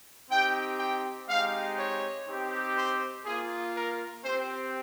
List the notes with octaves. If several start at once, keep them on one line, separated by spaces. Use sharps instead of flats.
C4 D#4 G4 G5
G5
G#3 C4 D#4 G4 F5
C#5
C4 D#4 G4
C5
A#3 F4 G#4
A#4
C4 G4 C5